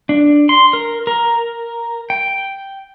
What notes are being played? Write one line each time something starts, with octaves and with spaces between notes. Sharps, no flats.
D4
C6
A#4
A#4
G5